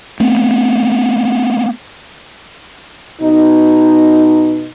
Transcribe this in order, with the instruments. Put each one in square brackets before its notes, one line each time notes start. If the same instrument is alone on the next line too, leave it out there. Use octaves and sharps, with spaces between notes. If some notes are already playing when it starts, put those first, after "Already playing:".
[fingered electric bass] A3 B3 C4
[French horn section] B2 D#4